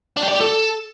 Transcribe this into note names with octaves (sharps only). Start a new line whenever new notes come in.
D4
G4
D5
G4
A4